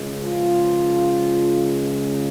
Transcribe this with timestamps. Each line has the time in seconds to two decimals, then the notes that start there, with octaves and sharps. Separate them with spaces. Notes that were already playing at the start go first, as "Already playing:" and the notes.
Already playing: C#2 C#3 G#3
0.21 F3 F4